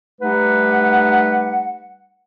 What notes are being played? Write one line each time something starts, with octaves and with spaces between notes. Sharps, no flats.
G3 A3 D#4 G4 B4 F#5